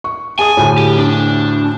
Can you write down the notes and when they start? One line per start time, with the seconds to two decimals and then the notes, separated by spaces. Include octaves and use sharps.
0.04 C#6
0.39 G#4 G#5 A5 D#6
0.57 D2 A2
0.78 G4
0.98 D4